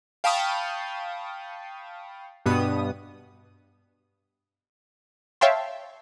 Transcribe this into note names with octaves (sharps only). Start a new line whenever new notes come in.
F5 G5 A5 B5 C#6 D#6
G2 B2 B3 D#6
C#5 E5 F5 G5 A5 C6